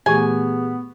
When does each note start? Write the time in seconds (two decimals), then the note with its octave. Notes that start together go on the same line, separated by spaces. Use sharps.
0.06 A#2 E3 A3 B3 G4 G#4 G#5 C#6